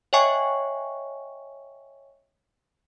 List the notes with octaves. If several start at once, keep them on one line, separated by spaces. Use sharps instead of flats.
C#5 D#5 E5 G5 G#5 C#6